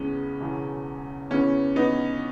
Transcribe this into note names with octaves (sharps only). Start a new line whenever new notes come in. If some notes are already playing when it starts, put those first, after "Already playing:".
Already playing: E2 C#3 G#3 B3 C#4
E1 E2 C#3
E2 C#3 E3 B3 C#4
B3 D#4